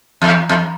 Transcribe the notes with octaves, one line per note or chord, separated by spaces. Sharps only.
E2
E2